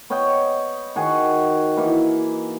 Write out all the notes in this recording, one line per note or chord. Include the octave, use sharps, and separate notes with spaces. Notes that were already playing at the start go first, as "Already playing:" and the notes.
B3 C#5 D#5 G5
D#3 F#4 G#4
E3 A#3 D#4